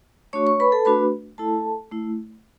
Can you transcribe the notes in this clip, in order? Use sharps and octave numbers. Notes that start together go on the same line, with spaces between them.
A3 D4 F#4 C#5 C#6
C#5 C#6
B4 B5
A4 A5
A3 D4 F#4 B4 B5
A3 E4 A4 A5
A3 E4